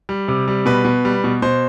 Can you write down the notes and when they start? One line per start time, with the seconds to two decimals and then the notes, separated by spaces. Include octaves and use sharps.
0.09 G3
0.28 C3
0.48 G3
0.66 B2 B4
0.85 B2
1.05 G3
1.24 B2
1.42 B2 C5